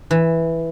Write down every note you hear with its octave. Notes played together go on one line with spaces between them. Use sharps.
E3